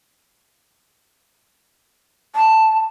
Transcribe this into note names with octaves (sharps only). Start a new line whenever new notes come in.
A5